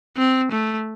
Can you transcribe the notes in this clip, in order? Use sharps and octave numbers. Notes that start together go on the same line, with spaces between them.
C4
A3